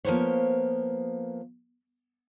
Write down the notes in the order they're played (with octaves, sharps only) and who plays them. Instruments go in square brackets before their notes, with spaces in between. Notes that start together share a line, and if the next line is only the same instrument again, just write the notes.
[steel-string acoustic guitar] F3 A#3 B3 C5 C#5